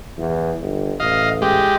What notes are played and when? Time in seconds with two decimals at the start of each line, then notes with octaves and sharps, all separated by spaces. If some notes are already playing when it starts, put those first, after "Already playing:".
0.18 E2
0.61 G1
1.00 A1 D#5 F5
1.42 G#3 G4